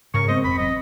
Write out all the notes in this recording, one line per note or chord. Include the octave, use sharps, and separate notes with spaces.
G#2 C#3 A#4 C#6
G#3 B3 C4 C5 D#5
E1 F2 B5
F1 F#3 D#5